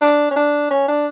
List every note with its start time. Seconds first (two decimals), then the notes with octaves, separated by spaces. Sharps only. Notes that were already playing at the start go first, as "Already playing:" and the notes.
0.02 D4
0.31 C#4
0.36 D4
0.71 C#4
0.88 D4